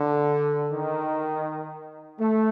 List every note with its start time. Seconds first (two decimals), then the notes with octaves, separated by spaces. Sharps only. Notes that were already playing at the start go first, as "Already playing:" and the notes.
Already playing: D3
0.72 D#3
2.19 A3